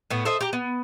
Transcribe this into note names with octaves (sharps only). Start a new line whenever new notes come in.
A2 B3
A4 C5 D#5 E5
G4 A#5
B3